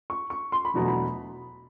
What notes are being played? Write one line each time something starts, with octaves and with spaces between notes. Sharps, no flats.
C#6
C#6
C6
B5
E1 E2 B2 F#3 A3 A#5
B5